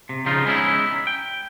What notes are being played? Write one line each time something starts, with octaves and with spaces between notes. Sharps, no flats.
C3
C#3 F3 D#4 F4
G#3 B3 C#4 D#4 E4
G5